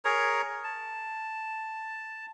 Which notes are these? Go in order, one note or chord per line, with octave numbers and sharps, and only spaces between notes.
G#4 A#4 C#5 A#5
A5